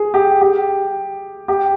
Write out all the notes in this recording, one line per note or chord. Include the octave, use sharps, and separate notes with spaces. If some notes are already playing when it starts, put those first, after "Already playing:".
Already playing: G#4
G4
G4
G4